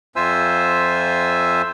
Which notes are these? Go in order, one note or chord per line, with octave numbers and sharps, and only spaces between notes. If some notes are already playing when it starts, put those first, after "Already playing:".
F2 F4 C5 E5 G#5 E6